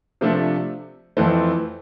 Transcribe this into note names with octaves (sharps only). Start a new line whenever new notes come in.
C3 F3 A3 D4
F2 E3 A3 C4